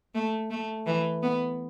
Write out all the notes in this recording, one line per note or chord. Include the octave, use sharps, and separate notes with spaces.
A3
A3
E3
B3